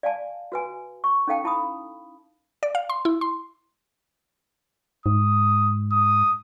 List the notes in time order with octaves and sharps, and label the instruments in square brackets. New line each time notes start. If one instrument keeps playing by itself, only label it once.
[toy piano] D5 F5 G#5 A5
F#4 B4 G#5
C#6
C#4 D#4 A4 F5 G5 A5
E4 A5 B5 D#6
[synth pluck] D5
F5
C6
E4
C6
[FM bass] G#2 [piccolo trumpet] D#6
[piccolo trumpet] D#6